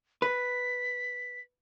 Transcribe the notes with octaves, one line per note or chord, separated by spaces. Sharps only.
B4 B6